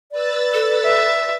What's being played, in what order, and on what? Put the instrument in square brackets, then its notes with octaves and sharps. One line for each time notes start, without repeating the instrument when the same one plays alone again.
[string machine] B4 E6 A6 [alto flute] D5
[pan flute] A4
[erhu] E5